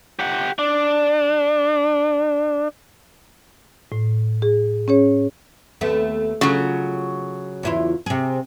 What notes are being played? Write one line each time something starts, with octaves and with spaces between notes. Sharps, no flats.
G4 F#5
D4
A2
G#4
C#4 G#4 C#5
D#2 A3 B3
C#3 F#3 F4 F#4
E2 E4 F4
C3 G#4